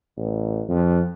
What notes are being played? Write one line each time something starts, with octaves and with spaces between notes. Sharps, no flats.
A1
F2